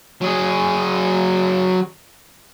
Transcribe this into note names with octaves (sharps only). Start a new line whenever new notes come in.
F#3 G#4